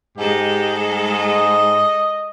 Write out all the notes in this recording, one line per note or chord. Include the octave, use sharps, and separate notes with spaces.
G#2 G#3 G4 A4
D#5